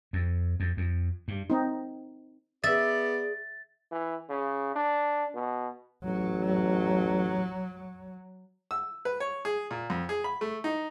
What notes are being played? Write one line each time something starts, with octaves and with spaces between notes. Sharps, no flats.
F2
F2
F2
G2
C4 D#4
B3 G#4 D5 E5 A6
E3
C#3
D4
B2
A1 F#3
E6
B4
C#5
G#4
A#2
F2
G#4
B5
A3
D#4